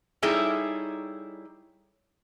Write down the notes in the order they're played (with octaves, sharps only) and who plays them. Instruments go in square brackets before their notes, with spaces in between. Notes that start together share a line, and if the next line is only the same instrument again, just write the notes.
[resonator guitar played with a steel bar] G3 D#4 E4 G#4 A4 C#5